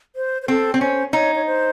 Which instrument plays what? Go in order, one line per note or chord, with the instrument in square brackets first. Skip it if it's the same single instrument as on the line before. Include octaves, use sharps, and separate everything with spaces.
[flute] C5
C5
[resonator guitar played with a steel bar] C4 [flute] A4
[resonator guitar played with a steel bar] C4
[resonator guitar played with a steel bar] C#4 [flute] C5
[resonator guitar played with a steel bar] D#4 [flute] C#5
[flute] C#5
C5